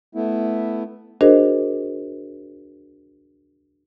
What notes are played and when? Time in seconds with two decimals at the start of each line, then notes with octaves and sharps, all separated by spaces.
0.15 A3 B3 E4
1.21 D4 F#4 G#4 A#4 C5 D#5